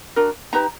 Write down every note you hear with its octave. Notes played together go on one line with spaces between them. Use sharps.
D4 F#4 A#4
D#4 G4 B4 A#5